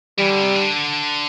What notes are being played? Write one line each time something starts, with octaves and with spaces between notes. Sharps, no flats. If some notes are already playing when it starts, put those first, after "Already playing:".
E3 G3
D3
C3
D3